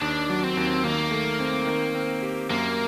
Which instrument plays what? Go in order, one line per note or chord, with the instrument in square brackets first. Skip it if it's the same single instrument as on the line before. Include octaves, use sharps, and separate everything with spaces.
[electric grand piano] D#2 [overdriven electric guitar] D4
[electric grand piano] F#3
[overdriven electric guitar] C4
[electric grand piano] D#2
[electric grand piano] D#3 [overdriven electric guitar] A#3
[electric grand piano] A3
C4
D#3
C4
G4
[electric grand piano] F#2 [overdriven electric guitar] A#3